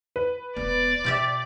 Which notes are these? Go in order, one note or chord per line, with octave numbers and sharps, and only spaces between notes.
B4
E1 B3 D5
B2 F4 G4 E5